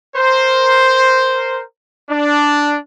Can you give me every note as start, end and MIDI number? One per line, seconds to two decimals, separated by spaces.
0.17 1.63 70
0.17 1.63 72
2.10 2.77 62